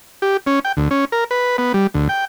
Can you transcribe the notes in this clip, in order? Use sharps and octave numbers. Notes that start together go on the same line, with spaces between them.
G4
C#4
G5
D2
C#4
A#4
B4
B3
G3
D2
G5